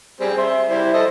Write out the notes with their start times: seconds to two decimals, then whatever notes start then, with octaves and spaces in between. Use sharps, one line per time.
0.20 G3 C4 G#4
0.38 E5 C6
0.69 G3 E4 C5
0.94 A4 D#5